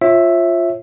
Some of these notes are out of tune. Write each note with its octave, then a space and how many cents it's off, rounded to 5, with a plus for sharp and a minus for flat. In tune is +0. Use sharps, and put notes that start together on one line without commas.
F4 +0 C#5 -40 E5 +0